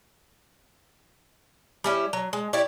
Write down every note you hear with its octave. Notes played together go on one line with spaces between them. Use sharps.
G3 C#4 E4
F#3
G#3
E4 G4 C#5 D5